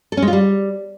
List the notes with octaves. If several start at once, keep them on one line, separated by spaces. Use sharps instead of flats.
A4
C#4
G#3
F4
G3